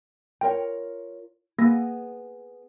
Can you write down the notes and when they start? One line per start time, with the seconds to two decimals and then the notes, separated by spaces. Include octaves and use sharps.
0.41 F4 A#4 C#5 G5
1.58 A#3 B3 G#4 A#6